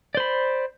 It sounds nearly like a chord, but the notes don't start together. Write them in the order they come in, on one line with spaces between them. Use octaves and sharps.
D5 C5 B5